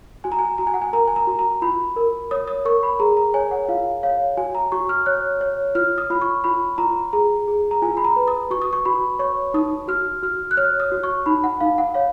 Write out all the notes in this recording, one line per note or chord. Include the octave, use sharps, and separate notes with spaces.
F#4 G#5
A#5
G#5
F#4 A#5
G#5
F#5
G#5
A#4 A#5
G#5
A#5
F#4
A#5
F4 B5
A#4
C#5 D#6
D#6
A#4 C#6
B5
G#4 A#5
A#5
C#5 G#5
F#5
F4 F5
C#5 F5
F#4 G#5
A#5
F#4 C#6
F6
C#5 F#6
C#5
F4 F6
D#6
F4 B5
C#6
F4 B5
F4 A#5
G#4 A#5
G#4
A#5
F4 G#5
B5
A#5
B4
D#6
F#4 C#6
D#6
C#6
F#4 B5
C#5 C#6
D#4 D#6
F#4 F6
F#4 F6
F#6
C#5 F6
D#6
F#4
C#6
D#4 B5
F#5
D#4 F5
F#5
C#5 F5